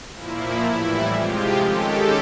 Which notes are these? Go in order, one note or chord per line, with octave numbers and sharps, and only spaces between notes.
A#2 F3 A#3 E4
A2 E3 G3 E4
C3 F3 G#3 F4 G4
D#3 G#3 C#4 G4 A4